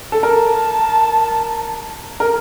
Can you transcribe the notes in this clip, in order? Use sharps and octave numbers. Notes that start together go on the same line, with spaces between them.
A4
A#4 A5
A#4